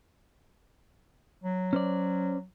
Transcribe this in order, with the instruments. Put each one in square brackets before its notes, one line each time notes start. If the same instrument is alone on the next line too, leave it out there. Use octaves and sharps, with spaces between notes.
[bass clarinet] F#3
[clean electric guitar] C#4 C5 D5